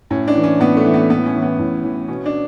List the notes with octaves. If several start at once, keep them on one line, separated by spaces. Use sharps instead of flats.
A2 C#4
D4
E3
C#4
A2 B3
A3
E3
B3
A2 B3
C#4
E3
B3
A2
E3
B2 C#4
D4